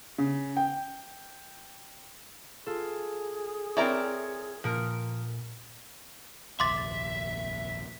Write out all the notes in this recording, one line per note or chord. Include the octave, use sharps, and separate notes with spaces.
C#3
G5
F4 G#4 A4
C4 E4 A#4 C#5 D5 A#5
A#2 F3 A#4
F1 A#1 D#2 E5 C6 D6 A6